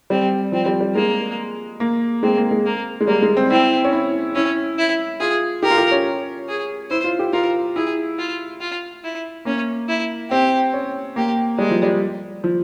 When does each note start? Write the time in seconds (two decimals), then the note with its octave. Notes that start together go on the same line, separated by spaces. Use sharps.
0.10 G3 C4
0.52 F3 C4
0.66 G3
0.81 G3
0.95 G#3 A#3
1.80 A#3
2.23 G#3 C4
2.37 A#3
2.51 G#3
2.66 A#3
3.01 G#3
3.07 G3 A#3
3.22 G#3
3.37 C4
3.50 C4 E4
3.84 C#4
3.93 E4
4.35 C#4 E4
4.78 E4
5.20 F4 G#4
5.63 G4 A#4
5.70 F4
5.77 G4
5.91 C#4
6.48 G#4
6.90 E4 C5
7.04 F4
7.19 G4
7.33 F4 A#4
7.76 E4 G#4
8.18 F4
8.60 F4
9.04 E4
9.45 A#3 C#4
9.88 E4
10.30 C4 G4
10.74 C#4
11.16 A#3 G4
11.58 G3 G#3
11.71 F3
11.83 G3
12.44 F3